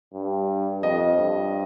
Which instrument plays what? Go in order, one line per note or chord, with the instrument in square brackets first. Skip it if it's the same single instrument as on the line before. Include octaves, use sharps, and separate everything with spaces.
[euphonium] G2
[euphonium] F2 [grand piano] D#5
[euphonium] G2